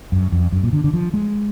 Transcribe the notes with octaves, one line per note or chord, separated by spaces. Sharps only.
F#2
F2
F#2
A#2
D3
D3
F3
G#3